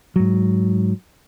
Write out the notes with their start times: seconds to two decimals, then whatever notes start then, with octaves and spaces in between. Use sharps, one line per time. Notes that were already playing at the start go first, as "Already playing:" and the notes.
0.16 G#2 F#3